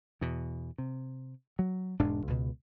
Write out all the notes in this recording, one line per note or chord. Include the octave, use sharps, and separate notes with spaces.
E2 B2
C3
F#3
E1 G#2 D4
C#2 B2